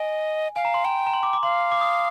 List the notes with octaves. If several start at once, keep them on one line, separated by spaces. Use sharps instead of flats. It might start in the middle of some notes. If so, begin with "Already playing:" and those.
Already playing: D#5 G#5
F5 G#5
A#5
C6
G5 A#5
A#5
C6
D6
D6
F5 C6
D6
D#6